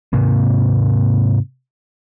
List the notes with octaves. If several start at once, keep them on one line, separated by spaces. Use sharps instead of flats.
G#2 C3 A#3